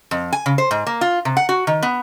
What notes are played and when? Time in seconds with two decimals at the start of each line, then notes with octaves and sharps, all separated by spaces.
0.11 F2
0.33 G#5
0.46 C#3
0.58 C5
0.71 G#2
0.87 A#3
1.01 F4
1.25 C3
1.37 F#5
1.49 F#4
1.67 D#3
1.83 B3